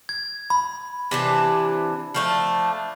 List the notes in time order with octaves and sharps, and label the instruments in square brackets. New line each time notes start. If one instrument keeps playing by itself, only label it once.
[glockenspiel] G#6
B5
[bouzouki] C3 E3 D4
F3 A3 D4